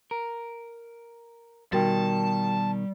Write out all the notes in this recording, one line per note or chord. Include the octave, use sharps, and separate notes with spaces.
A#4
B2 D#3 G3 F#4 A#4 G5 A5